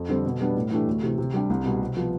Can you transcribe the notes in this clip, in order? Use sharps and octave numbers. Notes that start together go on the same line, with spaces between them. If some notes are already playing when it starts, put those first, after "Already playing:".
Already playing: F2
D3 G3 C4
B2
G3 B3 D4
A2
E3 A3 D4 G4
D2
C3 E3
C3
G3 D4 G4
C2
B2 G3
C3
F3 B3